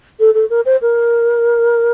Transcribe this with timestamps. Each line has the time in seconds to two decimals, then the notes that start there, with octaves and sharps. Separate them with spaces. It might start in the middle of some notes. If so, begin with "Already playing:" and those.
0.20 A4
0.34 A4
0.50 A#4
0.66 C5
0.82 A#4